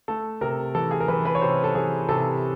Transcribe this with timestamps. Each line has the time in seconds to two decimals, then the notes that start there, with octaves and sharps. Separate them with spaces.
0.08 A3 A4
0.41 C3 A#4
0.75 E3 A4
0.91 G#4
1.00 A#4
1.08 E3 B4
1.25 B4
1.35 C#5
1.41 C3 C5
1.64 A4
1.75 E3 G#4
2.09 C3 A4